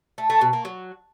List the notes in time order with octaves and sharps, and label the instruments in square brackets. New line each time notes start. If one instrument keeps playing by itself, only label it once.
[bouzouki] A3
A3
B2
A#3
F#3